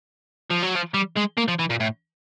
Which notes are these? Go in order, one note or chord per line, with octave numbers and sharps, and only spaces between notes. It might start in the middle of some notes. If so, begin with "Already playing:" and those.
F3
F#3
F3
G3
G#3
A#3
F3
E3
A#2
A2